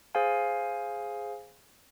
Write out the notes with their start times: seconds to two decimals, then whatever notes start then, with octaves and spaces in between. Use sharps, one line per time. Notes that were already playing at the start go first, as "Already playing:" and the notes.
0.15 G#4 C5 F5 G#5